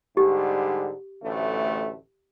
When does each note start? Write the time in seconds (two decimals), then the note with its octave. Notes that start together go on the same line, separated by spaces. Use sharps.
0.17 G#2 D3 G3 G4
1.22 A1 D2 A3